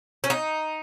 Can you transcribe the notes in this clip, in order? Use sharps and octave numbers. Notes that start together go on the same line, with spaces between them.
C#4
D#4